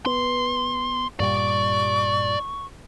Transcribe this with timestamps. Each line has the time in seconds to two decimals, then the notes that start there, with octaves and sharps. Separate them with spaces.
0.06 B3 C6
1.20 G2 A#2 G3 D5 C#6